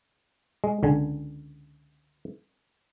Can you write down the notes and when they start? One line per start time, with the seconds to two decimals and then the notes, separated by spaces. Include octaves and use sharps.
0.64 G#3
0.83 C#2 D3 G#5